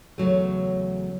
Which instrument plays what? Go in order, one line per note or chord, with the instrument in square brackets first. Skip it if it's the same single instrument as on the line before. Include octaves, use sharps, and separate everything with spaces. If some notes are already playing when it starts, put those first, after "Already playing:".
[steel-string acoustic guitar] E2 C#3 F#3 A3